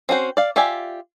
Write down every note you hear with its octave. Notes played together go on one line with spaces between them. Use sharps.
C4 C#4 F#4 C5
D5 F5
F4 G4 D5 E5 G#5